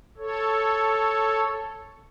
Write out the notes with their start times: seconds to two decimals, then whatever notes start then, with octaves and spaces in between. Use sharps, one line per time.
0.17 A4 C#5